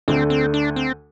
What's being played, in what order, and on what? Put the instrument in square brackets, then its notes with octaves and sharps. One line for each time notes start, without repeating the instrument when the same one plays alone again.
[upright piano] D2 D3 A3 [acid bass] C4
[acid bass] C4
D4
C4